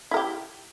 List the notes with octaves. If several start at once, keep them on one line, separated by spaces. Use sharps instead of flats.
E4 G4 A#4